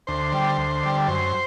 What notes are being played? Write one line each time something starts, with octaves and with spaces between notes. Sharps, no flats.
D2 C5
D3 G3
D2
D3 G3
F#2 C5